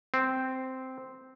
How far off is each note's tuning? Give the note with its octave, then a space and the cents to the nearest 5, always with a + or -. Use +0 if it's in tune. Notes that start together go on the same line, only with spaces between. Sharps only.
C4 -5